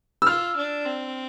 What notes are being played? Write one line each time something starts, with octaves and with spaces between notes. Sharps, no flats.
E6
F4 F6
D4
C4